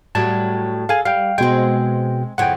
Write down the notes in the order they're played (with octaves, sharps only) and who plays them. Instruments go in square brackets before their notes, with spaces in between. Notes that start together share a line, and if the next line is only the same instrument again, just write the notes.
[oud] A2 F#3 G3 [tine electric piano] A5
[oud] G#4 A4 [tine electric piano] F5 G#5
[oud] G3 [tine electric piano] F5 G5
[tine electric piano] B2 G5 [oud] G#3 C4
[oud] F2 C#3 E3 [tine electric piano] F#5 G5